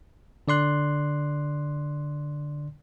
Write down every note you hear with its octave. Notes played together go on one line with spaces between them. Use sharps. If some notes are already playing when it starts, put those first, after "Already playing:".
D3 D5 C6 F#6